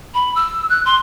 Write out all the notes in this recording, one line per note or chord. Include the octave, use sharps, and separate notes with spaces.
B5
E6
F#6
C6